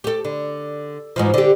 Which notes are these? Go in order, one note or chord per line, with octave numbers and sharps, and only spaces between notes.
G4 A4
D3
G#2 E3 F3
D3 G4